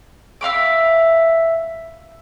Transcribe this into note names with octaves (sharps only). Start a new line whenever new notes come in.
E5 F5 B5 D6